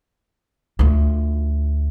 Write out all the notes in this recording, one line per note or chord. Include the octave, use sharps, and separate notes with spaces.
D2 F4